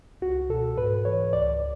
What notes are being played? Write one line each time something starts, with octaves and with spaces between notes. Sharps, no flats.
C#2 F#4
B2 A4
G#2 B4
E3 C#5
C#2 D5